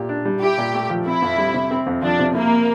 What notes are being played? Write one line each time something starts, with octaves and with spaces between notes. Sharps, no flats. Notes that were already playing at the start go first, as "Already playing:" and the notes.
Already playing: A#2 G4
D4
G3
E4 G4
A#2
A3
F3
C4 E4
F2
G3
C3
C4
F2
F3 D4
C3
A#3 E4